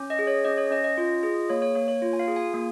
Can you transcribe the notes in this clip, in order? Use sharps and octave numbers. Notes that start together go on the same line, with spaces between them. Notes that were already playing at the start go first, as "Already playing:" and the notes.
Already playing: C#4
D#5
G#4
C#5
C#4 D#5
C#5
C#4 D#5
D#5
F4
G#4
A#3 C#5
C#5
A#3 C#5
C#5
F4
G#5
F5
G#4
G#5
A#3